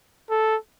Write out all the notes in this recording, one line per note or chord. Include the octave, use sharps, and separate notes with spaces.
A4